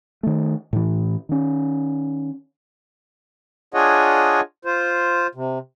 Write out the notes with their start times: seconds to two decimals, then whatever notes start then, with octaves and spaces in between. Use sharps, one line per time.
0.23 D#3 A3
0.73 A2 E3
1.29 D#3 C#4
3.74 D4 F4 G#4 C#5 D#5 F#5
4.65 F4 C5
5.35 C3